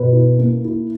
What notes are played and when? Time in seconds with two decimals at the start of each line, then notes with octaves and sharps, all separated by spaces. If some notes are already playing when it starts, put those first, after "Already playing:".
Already playing: B2 B4
0.13 E4
0.38 A#3
0.65 E4